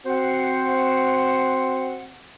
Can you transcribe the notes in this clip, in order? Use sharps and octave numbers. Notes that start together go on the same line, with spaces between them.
C4 F#4 C5 F#5